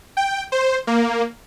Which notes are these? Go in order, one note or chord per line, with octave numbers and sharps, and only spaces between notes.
G5
C5
A#3